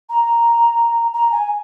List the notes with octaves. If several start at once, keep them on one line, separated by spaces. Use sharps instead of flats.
A#5
A#5
G#5